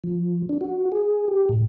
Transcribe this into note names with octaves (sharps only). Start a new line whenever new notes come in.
F3
D4
F#4
G#4
G4
A2